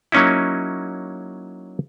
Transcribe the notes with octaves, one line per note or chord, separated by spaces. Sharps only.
F#3 A#3 C#4 D#4 E4